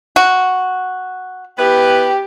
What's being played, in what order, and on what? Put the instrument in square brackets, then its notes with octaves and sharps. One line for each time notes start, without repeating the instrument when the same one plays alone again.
[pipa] F#4
[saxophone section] B3 E4 B4 [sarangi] G4